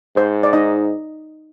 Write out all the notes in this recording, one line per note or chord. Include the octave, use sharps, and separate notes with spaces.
G#2 C5
D5
D#4 D#5